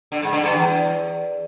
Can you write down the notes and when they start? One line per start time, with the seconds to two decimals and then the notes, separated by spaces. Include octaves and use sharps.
0.12 D3
0.22 G#2
0.33 D3
0.43 G2
0.54 E2